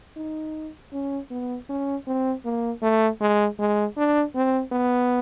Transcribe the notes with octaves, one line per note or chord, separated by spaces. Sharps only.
D#4
C#4
B3
C#4
C4
A#3
A3
G#3
G#3
D4
C4
B3